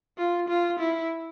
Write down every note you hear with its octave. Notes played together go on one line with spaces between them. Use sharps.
F4
F4
E4